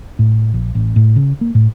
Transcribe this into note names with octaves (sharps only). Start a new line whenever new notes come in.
A2
A#1
A1
A2
C#3
A#3
A2